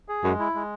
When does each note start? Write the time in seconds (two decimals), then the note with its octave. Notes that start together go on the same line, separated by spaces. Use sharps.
0.09 G#4
0.24 F#2 G#3
0.39 E4
0.55 G#3